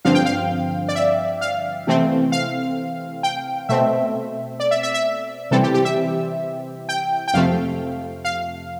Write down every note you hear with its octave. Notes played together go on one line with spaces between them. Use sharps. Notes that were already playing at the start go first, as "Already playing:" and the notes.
G2 D3 F3 C4 F5
G5
F5
D5
E5
F5
C3 E3 A3 C4
F5
G5
B2 A3 C4 E5
D5
E5
E5
E5
C3 E3 G3 C4 A4
G4
G4
E5
G5
G5
F2 C3 F3 A3 F5
F5